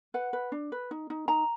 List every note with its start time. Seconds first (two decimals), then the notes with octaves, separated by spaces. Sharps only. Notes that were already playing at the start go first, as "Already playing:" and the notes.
0.14 B4 F#5
0.33 B4
0.52 D4
0.72 B4
0.91 D#4
1.10 D#4
1.28 D#4 A#5